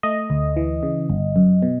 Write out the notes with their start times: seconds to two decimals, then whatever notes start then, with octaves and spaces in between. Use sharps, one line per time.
0.03 A3 D#5
0.30 D2
0.57 E3
0.83 C#3
1.10 G1
1.36 F#2
1.62 B2